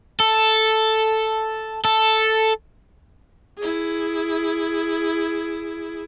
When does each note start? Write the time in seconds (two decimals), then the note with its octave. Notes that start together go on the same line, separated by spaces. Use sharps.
0.20 A4
1.85 A4
3.58 E4 G#4